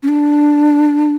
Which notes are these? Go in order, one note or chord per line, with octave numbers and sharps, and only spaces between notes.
C#4
D4